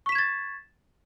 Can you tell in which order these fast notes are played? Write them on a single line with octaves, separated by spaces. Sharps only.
C#6 B6 E7 G#6 A6